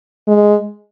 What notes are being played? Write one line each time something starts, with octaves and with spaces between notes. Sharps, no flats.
G#3